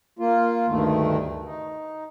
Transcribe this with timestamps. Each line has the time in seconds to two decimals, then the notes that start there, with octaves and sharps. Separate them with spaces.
0.19 A#3 F4
0.67 D2 G2 D#3 A3
1.45 D#4